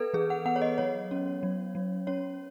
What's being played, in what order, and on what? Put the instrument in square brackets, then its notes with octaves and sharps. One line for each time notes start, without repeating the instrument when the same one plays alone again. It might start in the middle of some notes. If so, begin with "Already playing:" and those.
Already playing: [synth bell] B3 A4 B4
E3 G#4
F#5
B3 F#5
C#5
D#5
F#3 C#5
C#4
F#3
F#3
C#4 C#5